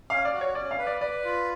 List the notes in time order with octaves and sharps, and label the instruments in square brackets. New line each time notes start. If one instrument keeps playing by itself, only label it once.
[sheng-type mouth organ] C#4 [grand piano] F5
[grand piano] D5
[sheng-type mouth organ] F#4
[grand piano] C#5
[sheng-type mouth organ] C#4 [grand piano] D5
[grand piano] F5
[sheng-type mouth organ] B4
[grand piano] D5
[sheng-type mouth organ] B4 [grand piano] D5
[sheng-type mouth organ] F4